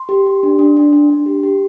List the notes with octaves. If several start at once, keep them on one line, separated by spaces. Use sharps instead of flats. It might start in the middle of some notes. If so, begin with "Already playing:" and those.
Already playing: C6
G4
G4
D4
D4
D4
D4
D4
G4
G4